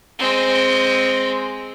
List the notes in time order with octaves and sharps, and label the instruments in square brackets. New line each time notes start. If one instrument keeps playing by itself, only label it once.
[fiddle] G#3 C4